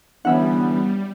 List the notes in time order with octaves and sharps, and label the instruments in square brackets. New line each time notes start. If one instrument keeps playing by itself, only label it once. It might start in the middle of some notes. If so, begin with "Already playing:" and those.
[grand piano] D3 E3 [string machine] G3 [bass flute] B3 [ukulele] C#4 E5 F#5